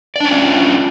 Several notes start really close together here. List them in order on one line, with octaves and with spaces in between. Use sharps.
D5 D4 C#4 F4